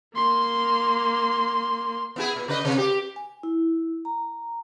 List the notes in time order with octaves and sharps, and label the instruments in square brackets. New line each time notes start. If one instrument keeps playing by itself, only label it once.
[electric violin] A#3 C6
[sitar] B3 E4 G#4
A#2
C#3 B4 D#5
C3
G4
[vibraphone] G#5
E4
A#5